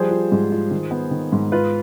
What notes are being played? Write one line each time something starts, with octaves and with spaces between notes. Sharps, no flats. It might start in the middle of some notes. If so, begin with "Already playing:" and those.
Already playing: F3 G3 G#4 C5
F4
G#2
F4
D#3
B3
D#3
G#2
F4 B4